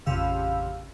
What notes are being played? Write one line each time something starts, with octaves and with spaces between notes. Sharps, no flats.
A1 F2 C#3 G4 F5 E6